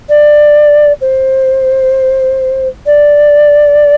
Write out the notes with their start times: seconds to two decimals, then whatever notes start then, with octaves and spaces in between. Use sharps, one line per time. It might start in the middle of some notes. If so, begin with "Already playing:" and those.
0.09 D5
1.01 C5
2.86 D5